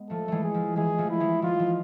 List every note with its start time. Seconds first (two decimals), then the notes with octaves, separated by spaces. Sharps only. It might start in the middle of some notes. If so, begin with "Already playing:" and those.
Already playing: G#3 B3
0.10 F3 A3 A4
0.28 E3 G#3 A3
0.43 G#4
0.54 F3
0.76 E3 G#3 G#4
0.98 F3 A3
1.10 E4
1.20 E3 G#3
1.42 F3 F4
1.59 F3